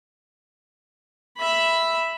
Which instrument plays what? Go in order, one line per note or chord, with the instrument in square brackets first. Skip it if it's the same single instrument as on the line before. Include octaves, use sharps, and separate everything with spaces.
[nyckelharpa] E5 B5